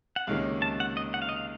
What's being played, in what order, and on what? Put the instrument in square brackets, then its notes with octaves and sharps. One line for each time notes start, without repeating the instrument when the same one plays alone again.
[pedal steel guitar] F#5
[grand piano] C#2 C3 D#3 A#3 C#4 [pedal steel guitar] F5
[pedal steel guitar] A5
F#5
D#5
F#5
F5
D#5
F5